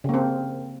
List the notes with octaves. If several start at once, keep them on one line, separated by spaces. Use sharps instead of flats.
C#3 A#3 C4